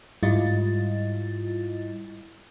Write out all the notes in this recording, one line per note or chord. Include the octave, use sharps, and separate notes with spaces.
G#2 G3 E4 F4 D#5 A6